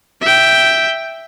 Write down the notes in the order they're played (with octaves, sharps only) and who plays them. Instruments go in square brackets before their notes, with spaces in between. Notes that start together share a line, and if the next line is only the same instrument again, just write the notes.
[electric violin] E5 G5